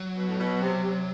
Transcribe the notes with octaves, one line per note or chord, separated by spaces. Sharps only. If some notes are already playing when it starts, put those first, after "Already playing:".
Already playing: F#3
B2
A2
B2
C3
C3